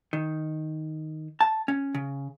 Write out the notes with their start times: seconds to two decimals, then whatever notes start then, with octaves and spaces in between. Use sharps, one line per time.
0.13 D#3
1.41 A5
1.68 C#4
1.95 C#3